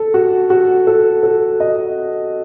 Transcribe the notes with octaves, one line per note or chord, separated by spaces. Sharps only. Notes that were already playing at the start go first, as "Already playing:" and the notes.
Already playing: A4
F#4
F#4
A4
A4
D#5